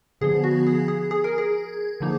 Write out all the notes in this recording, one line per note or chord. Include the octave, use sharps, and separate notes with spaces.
D3 F3 B3 G#4
F#4
G#4
G#4
G#4
A#4
G#4
D3 F3 A#3 D#4